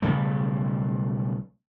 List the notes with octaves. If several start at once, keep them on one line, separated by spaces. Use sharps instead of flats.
B1 C#3 G3 A3